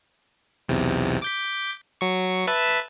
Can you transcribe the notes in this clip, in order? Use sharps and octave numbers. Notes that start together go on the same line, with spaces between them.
B1 E2 C3
D6 G6 B6
F#3 C#6
B4 E5 A5